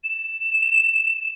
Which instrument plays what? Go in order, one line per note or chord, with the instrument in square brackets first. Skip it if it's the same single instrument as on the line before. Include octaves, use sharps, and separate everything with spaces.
[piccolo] E7